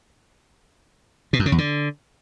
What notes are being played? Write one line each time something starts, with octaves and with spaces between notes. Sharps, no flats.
B2
F#2
C#3
E2
D3